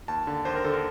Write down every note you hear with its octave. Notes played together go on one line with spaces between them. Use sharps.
D#2 A5
D3
D#2 C5
A#4
D3 A4
A#4